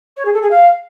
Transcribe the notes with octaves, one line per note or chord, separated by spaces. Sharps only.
C#5
G#4
A4
G#4
F5